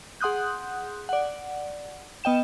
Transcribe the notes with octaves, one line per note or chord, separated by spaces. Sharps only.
G#4 F#5 C6 D#6 F#6 G6
D5 F#5
B3 D#5 G5 E7